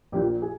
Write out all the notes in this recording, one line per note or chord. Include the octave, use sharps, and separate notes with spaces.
A#1 A#2 F3 G4
G#4